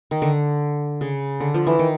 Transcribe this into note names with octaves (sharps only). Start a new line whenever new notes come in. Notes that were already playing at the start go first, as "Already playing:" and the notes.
D#3
D3
C#3
D3
F3
E3
D#3